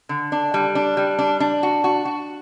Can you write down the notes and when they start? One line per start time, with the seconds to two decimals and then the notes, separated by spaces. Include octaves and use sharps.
0.09 D3
0.32 D4
0.54 G3
0.75 D4
0.97 G3
1.19 D4
1.40 D4
1.63 F#4
1.84 F#4
2.05 F#4